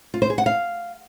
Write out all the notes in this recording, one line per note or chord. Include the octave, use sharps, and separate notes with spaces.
F4
C5
G#4
F#5
F5